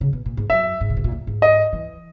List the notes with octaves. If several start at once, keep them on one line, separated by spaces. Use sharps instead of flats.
C#3
B2
A#2
G#2
F#2 E5
G#2
C#3
B2
A#2
G#2
G#2
D#5
E3